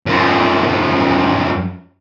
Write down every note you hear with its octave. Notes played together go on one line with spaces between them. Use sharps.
F#2 F3